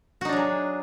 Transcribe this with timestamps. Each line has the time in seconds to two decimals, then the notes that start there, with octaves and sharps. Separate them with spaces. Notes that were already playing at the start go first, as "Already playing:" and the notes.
0.21 F#4
0.25 D#4
0.29 D4
0.33 F#3
0.36 G#4